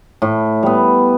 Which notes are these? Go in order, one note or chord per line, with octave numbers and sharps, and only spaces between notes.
A2
G3 B3